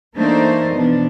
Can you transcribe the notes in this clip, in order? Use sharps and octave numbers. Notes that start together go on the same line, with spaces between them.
E3 A3 A#3 D4 D#4 C5
B2 E3 F3 D4